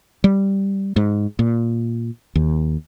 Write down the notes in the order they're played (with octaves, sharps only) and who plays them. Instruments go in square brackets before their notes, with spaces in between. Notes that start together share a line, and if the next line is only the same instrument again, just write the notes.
[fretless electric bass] G3
G#2
A#2
D#2